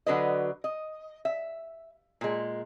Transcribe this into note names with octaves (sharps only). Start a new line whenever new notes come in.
D3 F#3 B4 D#5
D#5
E5
A#2 G#3